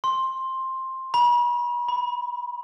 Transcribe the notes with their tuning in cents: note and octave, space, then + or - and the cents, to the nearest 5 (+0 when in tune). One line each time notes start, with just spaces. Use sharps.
C6 +10
B5 -40
B5 -5